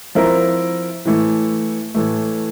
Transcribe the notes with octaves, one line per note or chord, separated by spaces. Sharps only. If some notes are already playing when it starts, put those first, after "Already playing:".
F3 C4 E4 A#4
A2 E3 A3
A2 E3 A3